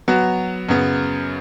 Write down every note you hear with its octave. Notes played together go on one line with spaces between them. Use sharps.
F#3 B3 F#4
F#2 C#3 B3